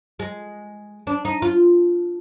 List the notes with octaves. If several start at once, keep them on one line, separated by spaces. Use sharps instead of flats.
G#3
D4
D#4
F4